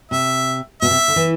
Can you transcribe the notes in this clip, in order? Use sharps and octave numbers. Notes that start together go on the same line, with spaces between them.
C3 E5
B2 E5
C3
D3
E3